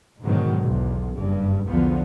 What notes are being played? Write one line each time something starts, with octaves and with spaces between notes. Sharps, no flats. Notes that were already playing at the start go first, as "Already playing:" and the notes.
G#2 B2 D3 D#3 F#3
B1 E2
F#1 G2
B1 E2 D3 F3 B3